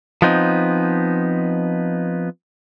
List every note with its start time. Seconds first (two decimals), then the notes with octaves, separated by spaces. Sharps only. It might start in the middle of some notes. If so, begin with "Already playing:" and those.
0.22 F3 B3 C4 D#4